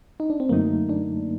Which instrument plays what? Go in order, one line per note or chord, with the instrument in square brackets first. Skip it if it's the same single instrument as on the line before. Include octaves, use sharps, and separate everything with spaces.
[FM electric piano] D#4
D4
C4
[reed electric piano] F#2 D3 F#3 A3 D#4 [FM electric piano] A#3
[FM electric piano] D4